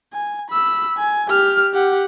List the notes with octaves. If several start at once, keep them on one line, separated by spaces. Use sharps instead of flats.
G#5
B5 E6
G#5
G4 F6
G4 F#5